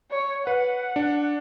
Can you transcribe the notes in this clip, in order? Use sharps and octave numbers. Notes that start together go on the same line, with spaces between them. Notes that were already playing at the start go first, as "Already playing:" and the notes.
C#5
B4 F#5
D4